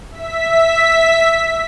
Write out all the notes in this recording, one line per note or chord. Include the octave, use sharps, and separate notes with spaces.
E5 B6